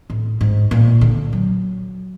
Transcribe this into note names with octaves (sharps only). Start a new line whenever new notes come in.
A2
G#2
A#2
D3
F#3